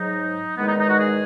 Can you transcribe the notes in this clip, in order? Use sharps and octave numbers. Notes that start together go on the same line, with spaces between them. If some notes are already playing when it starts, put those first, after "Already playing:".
Already playing: G#2 F#3 D#4
E2 D#3 G#3 B3
D#4
D#4
F#4
G#4